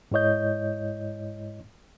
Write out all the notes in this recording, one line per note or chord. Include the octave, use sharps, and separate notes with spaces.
G#2 G#3 E4 C#5 D#5 G6